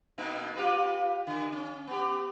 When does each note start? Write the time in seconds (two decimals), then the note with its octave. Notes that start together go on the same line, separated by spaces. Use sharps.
0.18 B2 A#3 D#4
0.56 F4 G4 B4
1.27 D3
1.52 C#4
1.87 B3 G4